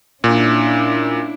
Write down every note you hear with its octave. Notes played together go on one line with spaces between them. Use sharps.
A#2 C#4 D4 E4